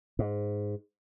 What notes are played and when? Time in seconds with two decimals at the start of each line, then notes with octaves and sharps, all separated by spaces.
0.19 G#2